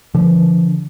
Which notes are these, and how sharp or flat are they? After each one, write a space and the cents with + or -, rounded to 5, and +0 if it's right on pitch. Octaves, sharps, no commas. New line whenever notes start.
D3 -25 F3 -40